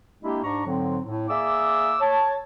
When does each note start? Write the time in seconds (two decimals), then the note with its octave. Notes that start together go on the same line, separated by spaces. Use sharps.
0.23 G#3 A#3 D4 E4 G4
0.44 G#2 D4 A#5 C#6
0.66 G#2 D3 F#3 C4
1.05 A2
1.29 A#3 G#4 D5 E5 D6 E6
2.00 C#5 A5